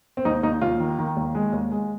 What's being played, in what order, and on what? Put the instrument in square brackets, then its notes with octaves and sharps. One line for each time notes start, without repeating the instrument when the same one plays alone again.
[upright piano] C4
D#2 D#4
D#2 D#4
D#2 F4
D#3
D#3
D#2
G#3
D#2
G#3